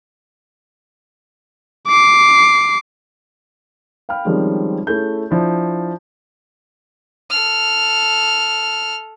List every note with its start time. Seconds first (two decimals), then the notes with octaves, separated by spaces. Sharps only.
1.87 D6 C7
4.09 F5 G5 B5 F6
4.25 D#3 F3 G3 G#3 C4 C#4
4.87 A3 C#4 E4 G#4 G6
5.31 F3 D4 E4
7.30 A4 F6